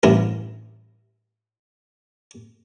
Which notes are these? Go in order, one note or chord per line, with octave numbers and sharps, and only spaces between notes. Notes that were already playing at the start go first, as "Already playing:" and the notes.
A1 G2 E4 A#4